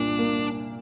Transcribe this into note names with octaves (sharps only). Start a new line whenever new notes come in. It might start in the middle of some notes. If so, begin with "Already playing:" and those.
Already playing: C2 A#2 A#3 D4
A#3